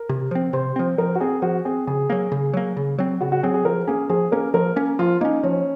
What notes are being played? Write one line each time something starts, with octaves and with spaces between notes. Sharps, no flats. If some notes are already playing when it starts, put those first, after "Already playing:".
Already playing: A#4
C3
F3 C4
C3 C5
F3 C4
F3 A#4
F#4
C4 G#4
F3 F#4
C4 G#4
C#3 G#4
F#3 A#3
C#3
F#3 A#3
C#3
F#3 C4
C#3 F#4
F#4
F#3 C4 G#4
G#4
F3 A#4
A#3 C#4 G#4
F3 G#4
A#3 C#4 A#4
F3 A#4
A#3 C#4
F3 F4
A#3 C#4 D#4
F3 C#4